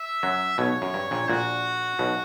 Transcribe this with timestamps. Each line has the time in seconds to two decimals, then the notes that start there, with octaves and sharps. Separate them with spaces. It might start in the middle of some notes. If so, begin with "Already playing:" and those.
Already playing: E5
0.23 F#2 F#3
0.58 B1 B2 C#5
0.82 F#2
0.94 G2
1.11 A#1 A#2
1.29 A#1 A#2 F#4
1.99 B1 B2